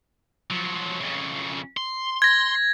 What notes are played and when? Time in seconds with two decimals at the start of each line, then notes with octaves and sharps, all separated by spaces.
0.50 F3 F#3
1.00 F2 C#3
1.77 C6
2.22 G#6 A#6